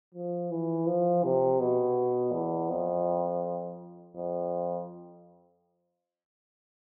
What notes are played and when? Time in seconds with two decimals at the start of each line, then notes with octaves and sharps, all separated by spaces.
0.15 F3
0.51 E3
0.87 F3
1.24 C3
1.60 B2
2.32 E2
2.70 F2
4.15 F2